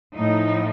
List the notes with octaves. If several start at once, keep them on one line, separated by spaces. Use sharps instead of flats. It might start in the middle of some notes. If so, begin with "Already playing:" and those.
A2 F3 D#4